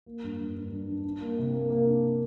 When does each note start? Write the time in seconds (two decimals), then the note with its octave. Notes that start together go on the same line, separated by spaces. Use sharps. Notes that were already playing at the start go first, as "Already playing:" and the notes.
0.06 A#3
0.23 G2
0.39 G2
0.55 G2
0.71 G2
0.88 D4
1.04 D4
1.21 A#3
1.38 C3
1.54 A#3
1.70 A#3
1.86 D4